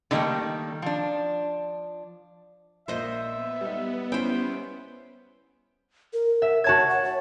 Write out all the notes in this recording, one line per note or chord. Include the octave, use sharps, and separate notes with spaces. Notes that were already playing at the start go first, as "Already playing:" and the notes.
D3 D#3 G3 A3 A#3
F3 D4
A#1 A#3 C5 D#5 E5
B3
G3 D#4
G3 C#4 E4 C5 G5
A#4
E5
F#4 C#5 A5 G#6
F#5
C#5